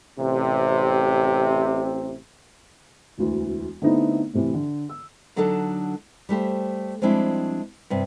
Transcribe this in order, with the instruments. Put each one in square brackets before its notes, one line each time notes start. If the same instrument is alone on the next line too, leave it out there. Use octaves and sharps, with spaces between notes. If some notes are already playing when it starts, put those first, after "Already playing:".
[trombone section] A1 C3
[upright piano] E1 D2 E3
D3 A3 B3 C4 D#4 E4
A2 C3 E3
D3
E6
[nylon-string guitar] D3 F#3 D4 D#4 A4 A5
G3 A3 G4 C5
F3 G3 G#3 C4 D4 E4
G2 C3